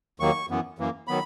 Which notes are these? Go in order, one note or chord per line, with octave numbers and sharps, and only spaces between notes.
D#2 D#3 F#3 A#3 C#6
F#2 E3 B3
F#2 E3 A#3
D#3 F#3 B3 B5